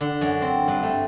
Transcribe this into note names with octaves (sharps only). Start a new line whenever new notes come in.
D3
F#2
C4
G2
A3